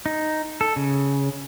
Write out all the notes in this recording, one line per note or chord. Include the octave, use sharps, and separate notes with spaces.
D#4
A4
C#3